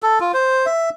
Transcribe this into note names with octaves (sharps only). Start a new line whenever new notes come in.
A4
F4
C5
E5